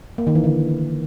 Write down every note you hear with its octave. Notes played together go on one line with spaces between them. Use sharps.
A#3
D#3
E3
D3